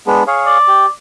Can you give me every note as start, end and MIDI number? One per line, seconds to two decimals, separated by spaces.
0.07 0.23 56
0.07 0.23 59
0.07 0.23 62
0.27 0.58 68
0.27 0.58 73
0.27 0.58 77
0.47 0.88 74
0.68 0.86 67